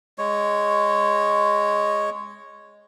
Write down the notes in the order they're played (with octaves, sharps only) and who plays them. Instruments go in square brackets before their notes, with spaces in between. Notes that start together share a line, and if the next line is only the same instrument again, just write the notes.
[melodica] G#3 C#5